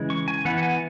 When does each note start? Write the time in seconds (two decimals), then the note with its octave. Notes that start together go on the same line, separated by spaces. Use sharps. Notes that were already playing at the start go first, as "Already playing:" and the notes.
Already playing: C#3 E3 G#3
0.10 C#6
0.28 G#5
0.45 E3 B3 F#5
0.63 G#5